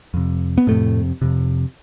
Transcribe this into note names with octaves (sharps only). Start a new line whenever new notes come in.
F2 C3
B3
F2 A2 C3 A3
F2 C3